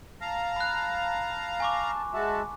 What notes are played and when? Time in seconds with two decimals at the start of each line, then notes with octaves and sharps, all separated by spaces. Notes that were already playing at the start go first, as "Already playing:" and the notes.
0.21 F5 A5 A#5
0.56 B5 F#6
1.60 G#5 C#6 D6
2.14 G#3 F#4 E5 A5